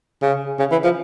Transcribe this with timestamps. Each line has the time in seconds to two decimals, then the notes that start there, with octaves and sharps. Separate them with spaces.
0.22 C#3
0.59 C#3
0.71 E3
0.84 F3